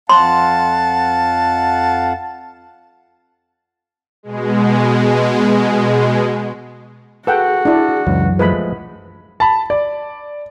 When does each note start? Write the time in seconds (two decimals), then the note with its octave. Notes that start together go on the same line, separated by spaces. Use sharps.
0.09 F2 F5 F#5 A5 C6
4.23 B2 G#3
7.27 F#4 G#4 A4 B4 F#5 G5
7.65 D4 E4
8.07 C#2 F#2 E3 F#3
8.39 F3 G#3 A3 B4 B5
9.40 A5 B5
9.70 D5